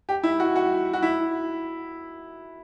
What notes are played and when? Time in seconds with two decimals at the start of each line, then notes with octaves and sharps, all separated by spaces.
0.09 G4
0.23 E4
0.40 F#4
0.56 F#4
0.93 F#4
1.02 E4